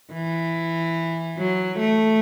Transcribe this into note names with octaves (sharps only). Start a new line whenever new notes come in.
E3
F#3
A3